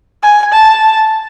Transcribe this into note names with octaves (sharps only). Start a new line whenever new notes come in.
G#5
A5